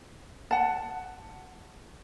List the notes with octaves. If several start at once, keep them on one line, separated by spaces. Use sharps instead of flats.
F#5 A5